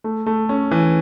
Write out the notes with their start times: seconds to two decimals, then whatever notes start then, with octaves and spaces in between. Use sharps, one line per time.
0.04 A3
0.26 A3
0.49 C#4
0.71 E3